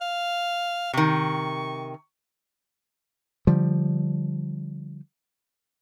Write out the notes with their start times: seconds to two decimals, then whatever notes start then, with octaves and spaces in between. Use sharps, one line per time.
0.01 F5
0.93 C3 D#3 C#6
3.47 D3 F3 G3